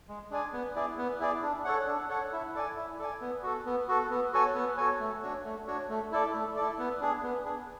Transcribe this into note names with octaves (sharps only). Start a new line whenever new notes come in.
G#3
D4 G#4 D5 G#5
B3
E4 G#4 D5
B3
E4 G#4 D5
D4
A4 C#5 F#5
D4
A4 C#5 F#5
E4
A4 D5 G#5
E4
A4 D5 G#5
B3
F#4 A4
B3
F#4 A4
B3
F#4 A4 C#5 G#5
B3
F#4 A4 C#5 G#5
A3
D4 F#4 C#5
A3
D4 F#4 C#5
A3
E4 A4 D5
A3
E4 A4 D5
B3
D4 G#4
B3
D4 G#4